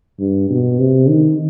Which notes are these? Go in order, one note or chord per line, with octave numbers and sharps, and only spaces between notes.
G2
B2
C3
D#3